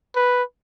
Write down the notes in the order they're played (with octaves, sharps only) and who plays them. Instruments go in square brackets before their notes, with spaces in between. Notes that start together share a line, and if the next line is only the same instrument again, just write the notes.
[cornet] B4